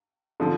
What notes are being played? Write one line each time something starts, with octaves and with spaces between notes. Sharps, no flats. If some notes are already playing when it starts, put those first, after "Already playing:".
D3 F3